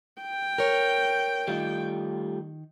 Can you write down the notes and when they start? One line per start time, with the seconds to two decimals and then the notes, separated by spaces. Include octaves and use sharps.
0.22 G5
0.58 A#4 C#5
1.48 D#3 G3 A3 F4